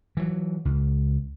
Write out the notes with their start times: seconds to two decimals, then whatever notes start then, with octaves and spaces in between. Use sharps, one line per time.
0.17 E3 F#3
0.65 C#2